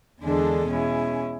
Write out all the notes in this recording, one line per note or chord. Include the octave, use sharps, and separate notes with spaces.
E2 D3 G#3 D4 A4
B2 G#3 C#4 E4